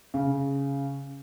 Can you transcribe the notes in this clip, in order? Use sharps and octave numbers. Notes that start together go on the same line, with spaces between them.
C#3